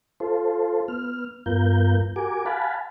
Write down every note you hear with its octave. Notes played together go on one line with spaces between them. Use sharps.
F4 A4 C5
B3 F6
G2 B3 F4 A#4 G6
F#4 G4 A#4 G#5 D6
F5 F#5 G#5 A5 B5